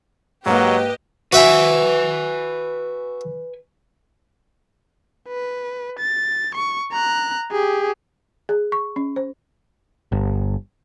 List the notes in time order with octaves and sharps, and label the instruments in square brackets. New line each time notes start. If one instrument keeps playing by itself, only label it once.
[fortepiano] G#2 A#3 [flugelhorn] F#3 [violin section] G4 D#5 [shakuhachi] B4
[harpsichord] F#4 E5 G5 [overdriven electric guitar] B4 G#5
[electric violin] B4
A6
C#6
A#5 F#6
G4 G#4
[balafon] G#4
C#6
C#4
C5
[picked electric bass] G1